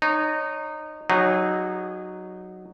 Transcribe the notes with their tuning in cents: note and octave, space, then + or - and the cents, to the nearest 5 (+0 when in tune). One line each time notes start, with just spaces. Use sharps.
D#4 -20 C#5 +0
F#3 +0 D#4 -15 G#4 -35